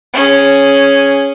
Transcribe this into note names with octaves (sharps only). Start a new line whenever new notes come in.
C#4 G#4